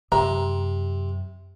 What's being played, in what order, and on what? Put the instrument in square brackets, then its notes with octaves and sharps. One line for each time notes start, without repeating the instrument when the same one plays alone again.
[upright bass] F#2 [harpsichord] C3 [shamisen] A#5